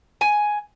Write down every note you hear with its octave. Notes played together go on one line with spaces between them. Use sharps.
G#5